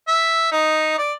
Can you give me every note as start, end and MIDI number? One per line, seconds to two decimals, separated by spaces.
0.08 0.49 76
0.52 0.96 63
0.98 1.13 74